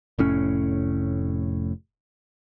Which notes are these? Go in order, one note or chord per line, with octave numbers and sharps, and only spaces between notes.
F1 A2 C#4